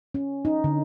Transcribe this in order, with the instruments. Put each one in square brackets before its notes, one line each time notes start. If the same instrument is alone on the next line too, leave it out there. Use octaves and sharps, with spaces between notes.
[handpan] C#4
D#4
D3